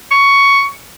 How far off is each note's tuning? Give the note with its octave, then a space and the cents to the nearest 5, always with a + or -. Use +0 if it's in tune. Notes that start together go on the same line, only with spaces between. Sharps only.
C#6 +10